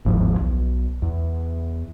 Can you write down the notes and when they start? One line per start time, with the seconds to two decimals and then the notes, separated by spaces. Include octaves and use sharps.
0.05 G1 D#2 G#2 F3
0.40 B1
1.02 E2